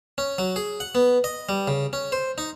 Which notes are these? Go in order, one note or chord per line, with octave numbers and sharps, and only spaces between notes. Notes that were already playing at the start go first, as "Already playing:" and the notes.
C#4
F#3
G#4
F#5
B3
D#5
G3
C#3
C#4
C5
D#4